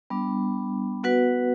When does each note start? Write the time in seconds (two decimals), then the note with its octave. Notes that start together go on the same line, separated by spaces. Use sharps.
0.10 G3 B3 D4
1.03 B3 F#4 B4 F#5